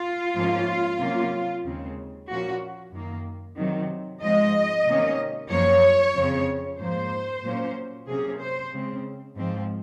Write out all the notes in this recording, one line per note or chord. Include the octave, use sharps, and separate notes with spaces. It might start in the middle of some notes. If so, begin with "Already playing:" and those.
Already playing: F4
G#2 F3 A#3 C#4
C3 F#3 A#3 C#4
D#2 C#3 G#3 C4
A#2 F3 A#3 C#4 F#4
F#2 D#3 A#3
C3 D#3 F#3
G#2 F3 G#3 C4 D#5
C3 D#3 A#3 C#4
F#2 F3 A#3 C#5
F2 C#3 F3 C4
G#2 F3 A#3 C5
A#2 F#3 A#3 C#4
C3 F#3 A#3 C#4 G#4
C5
C#3 G#3 C4
G#2 F3 C4